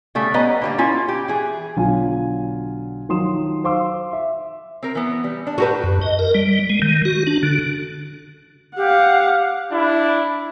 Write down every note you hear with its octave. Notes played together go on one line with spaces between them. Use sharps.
C#3 G3 A3
G3 B3 C#4 B4 D#5 A#5
D3 G3 A#3
C#4 E4 F4
G4
E3 G#4
B1 D3 F#3 F4 G#5
D#3 F3 F#3 C6 D#6 E7
C5 F5 C6 D6 E6
E5
C4 A#4
E3 B3
G3
D4
A2 F#4 G4 B4
F#2
D#5
A#4
G3
G#3
D#3
F#4
D4
D3
G4 F5 F#5
D4 E4